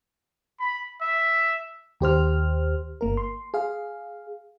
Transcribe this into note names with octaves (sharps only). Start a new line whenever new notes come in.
B5
E5
D#2 G4 C5 F6
G1 A#3 A#4
C6
G#4 F5